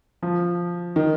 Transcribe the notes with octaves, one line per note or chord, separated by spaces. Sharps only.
F3
D#3